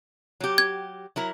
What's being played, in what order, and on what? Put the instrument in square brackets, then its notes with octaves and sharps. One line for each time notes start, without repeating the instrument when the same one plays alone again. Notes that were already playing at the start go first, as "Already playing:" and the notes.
[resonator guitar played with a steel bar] F#3 G4
[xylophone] G#6
[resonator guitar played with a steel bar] F#3 E4 A#4